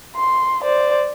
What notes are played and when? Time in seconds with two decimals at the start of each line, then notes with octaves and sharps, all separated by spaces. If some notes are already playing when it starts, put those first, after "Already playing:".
0.16 C6
0.62 C5 D5